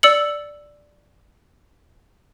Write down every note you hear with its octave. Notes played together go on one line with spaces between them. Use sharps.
D5 E6 C#7 F#7